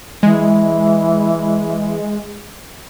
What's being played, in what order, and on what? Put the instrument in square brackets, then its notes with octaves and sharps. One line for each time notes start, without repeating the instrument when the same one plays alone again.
[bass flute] E3 [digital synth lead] G#3